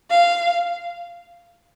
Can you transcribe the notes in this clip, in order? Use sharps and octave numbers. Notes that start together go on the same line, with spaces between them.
F5